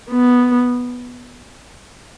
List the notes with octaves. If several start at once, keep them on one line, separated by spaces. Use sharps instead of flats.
B3